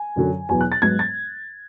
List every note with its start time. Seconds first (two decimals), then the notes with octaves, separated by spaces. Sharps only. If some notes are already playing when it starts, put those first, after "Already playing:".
Already playing: G#5
0.16 F#2 D3 F#3
0.49 E2 B2 F#3 B3 G#5
0.61 F#6
0.72 A6
0.82 G#2 F#3 B3 G#6
0.99 A6